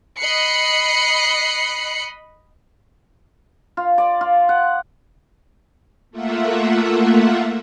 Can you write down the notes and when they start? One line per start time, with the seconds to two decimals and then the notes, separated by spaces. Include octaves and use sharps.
0.18 D#5 B5 F#6 C7 C#7
3.77 F4
3.98 D5
4.21 F4
4.49 F#5
6.11 A3 A#3 F4 E5 F#5